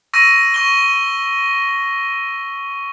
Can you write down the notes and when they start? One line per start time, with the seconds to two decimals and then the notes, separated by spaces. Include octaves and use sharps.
0.13 C#6 E6 A#6 D#7
0.54 C#6 G7